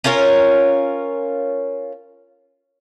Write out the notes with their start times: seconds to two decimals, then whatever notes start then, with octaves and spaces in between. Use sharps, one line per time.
0.04 C#4 F4 A#4 C#5